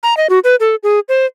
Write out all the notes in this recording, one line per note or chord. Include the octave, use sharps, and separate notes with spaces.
A#5
D#5
F#4
B4
A4
G#4
C5